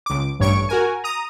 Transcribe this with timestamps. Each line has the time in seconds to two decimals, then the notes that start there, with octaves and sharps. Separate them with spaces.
0.06 C#2 D6
0.39 A1 G2 C#5 C#6 D7
0.69 F#4 A#4 G#5
1.04 A#5 D#6